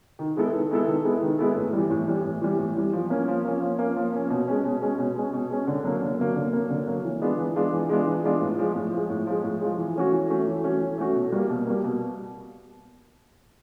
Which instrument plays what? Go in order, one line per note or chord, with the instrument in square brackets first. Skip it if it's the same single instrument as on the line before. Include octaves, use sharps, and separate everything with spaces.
[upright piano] D#3
G#3 B3 E4 A4
D#3
G#3 B3 E4 A4
D#3
G#3 B3 E4 A4
D#3
G#3 B3 E4 A4
A2
E3 G3
A2
E3 G3
A2
E3 G3
A2
E3 G3
F3
A#3 C#4
F3
A#3 C#4
F3
A#3 C#4
F3
A#3 C#4
B2
G#3 C#4
B2
G#3 C#4
B2
G#3 C#4
B2
G#3 C#4
D3
F#3 A#3
D3
F#3 A#3
D3
F#3 A#3
D3
F#3 A#3
E3
G#3 B3 D4 F4
E3
G#3 B3 D4 F4
E3
G#3 B3 D4 F4
E3
G#3 B3 D4 F4
A2
F3 G#3
A2
F3 G#3
A2
F3 G#3
A2
F3 G#3
E3
A3 C#4 F#4
E3
A3 C#4 F#4
E3
A3 C#4 F#4
E3
A3 C#4 F#4
B2
G3 A#3
B2
G3 A#3
B2